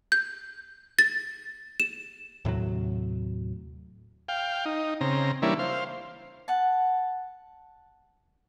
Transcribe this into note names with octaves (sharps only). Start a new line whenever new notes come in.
G6
A6
E7
D#2 A2 C3 F#3
F5 G5
D#4
C#3 C4 A#5
E3 G3 A#3 C#4 D4 E4
C5 F5
F#5 A5